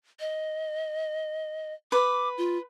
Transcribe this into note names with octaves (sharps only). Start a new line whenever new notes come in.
D#5
B4 D6
F4